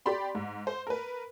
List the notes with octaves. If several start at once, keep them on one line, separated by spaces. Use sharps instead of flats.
G4 D5 B5 C6
G#2
C5
A#4 B4